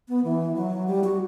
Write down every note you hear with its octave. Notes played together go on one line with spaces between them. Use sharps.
B3
E3
F#3
G3
F#4